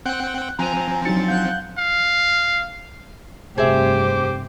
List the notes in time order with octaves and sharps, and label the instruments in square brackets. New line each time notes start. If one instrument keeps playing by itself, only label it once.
[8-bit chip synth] C4 F#5 G5 [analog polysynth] F#6
[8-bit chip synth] F3 C4 [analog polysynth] G#5 A#5
[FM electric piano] F#3 C#7 [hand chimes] D4 D#4 F#4 [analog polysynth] A6
[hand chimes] F5 F#5 [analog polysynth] F#6 G6
[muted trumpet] F5
[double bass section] F1 G2 C4 [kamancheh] G4 D6 [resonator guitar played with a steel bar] G#4 E5 [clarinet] C5